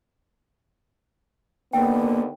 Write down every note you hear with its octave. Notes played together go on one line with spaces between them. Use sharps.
D#2 D3 A#3 B3 G5